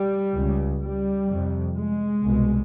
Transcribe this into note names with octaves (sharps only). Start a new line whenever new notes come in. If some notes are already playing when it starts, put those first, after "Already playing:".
Already playing: G3
C#2 C#3
G3
F2 C3
G#3
C2 B2